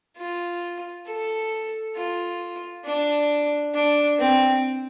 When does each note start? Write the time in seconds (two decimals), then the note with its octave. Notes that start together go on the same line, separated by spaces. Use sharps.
0.17 F4
1.07 A4
1.96 F4
2.85 D4
3.74 D4
4.19 C4